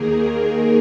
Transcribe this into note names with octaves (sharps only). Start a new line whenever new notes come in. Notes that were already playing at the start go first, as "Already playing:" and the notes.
Already playing: D#2 D#3 A#3 G#4 A#4
A#4